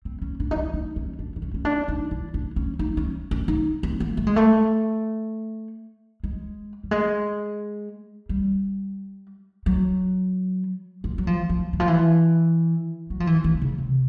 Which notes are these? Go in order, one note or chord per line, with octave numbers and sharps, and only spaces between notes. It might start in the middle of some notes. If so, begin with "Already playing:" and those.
C4
C#4
D4
D#4
D4
D#4
C#4
D4
D4
C#4
C#4
D4
D#4
E4
D4
C#4
D#4
C#4
C#4
D#4
C4
A#3
A3
G#3
A3
G#3
G3
G#3
G3
F#3
F3
F#3
F3
F3
E3
F3
E3
F#3
F3
E3
D#3
C3
C#3
C3